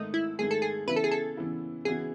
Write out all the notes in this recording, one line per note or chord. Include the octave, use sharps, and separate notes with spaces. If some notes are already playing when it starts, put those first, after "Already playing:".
Already playing: G#2 D#3 A3 D#4
E4
G#2 D#3 A3 G#4
A4
G#4
C#3 E3 B3 E4 B4
A4
G#4
A4
C#3 E3 B3 E4
C#3 E3 B3 F#4 G#4